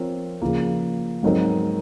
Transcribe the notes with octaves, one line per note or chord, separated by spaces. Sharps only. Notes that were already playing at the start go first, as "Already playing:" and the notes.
Already playing: F3 C4 F4 A#4 C#5
C#3 F3 A#3
G#2 F#3 C4 D#4 A#4